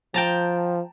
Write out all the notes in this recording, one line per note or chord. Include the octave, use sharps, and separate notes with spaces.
F3 G5 A5 A#5